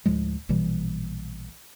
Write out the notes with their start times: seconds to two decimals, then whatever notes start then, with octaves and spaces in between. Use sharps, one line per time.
0.06 D2 A2 F3 G#3
0.49 A#1 B2 E3 G3